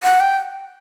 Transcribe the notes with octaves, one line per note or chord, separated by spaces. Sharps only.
F#5
G5